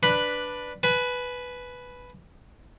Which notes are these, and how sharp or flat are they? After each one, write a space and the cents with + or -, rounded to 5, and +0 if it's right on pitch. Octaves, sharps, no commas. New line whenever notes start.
D4 +5 B4 +0 B5 +0
B4 +0 G#5 +40